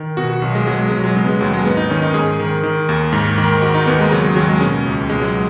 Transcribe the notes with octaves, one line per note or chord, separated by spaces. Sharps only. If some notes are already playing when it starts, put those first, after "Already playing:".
Already playing: D#3
B2 F#4
F#4
B1
G#3
B2 F#3
G#3
B1 F#3
F#3
C#3 G#3
B3
G#3
D#2 F#3
G#3
G#2 B3
D#4
D#3 C#4
D#4
G#2 G#4
D#3
D#3
D#2
G#2
D#3
D#3 F#4
D#4
D#2 B3
G#3
C#3 F#3
G#3
D#2 F#3
G#3
B2 C#4
C#2
B2 G#3
F#3
G#3